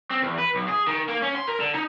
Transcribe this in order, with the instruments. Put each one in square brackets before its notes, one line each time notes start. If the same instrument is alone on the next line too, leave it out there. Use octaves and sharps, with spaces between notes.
[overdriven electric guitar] C4
E2
B4
B1
G#4
D#3
A#3
C#4
C6
A#4
D3
D#4